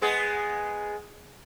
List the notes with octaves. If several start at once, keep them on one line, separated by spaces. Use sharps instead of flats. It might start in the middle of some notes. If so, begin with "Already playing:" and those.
G#3 B3 G#4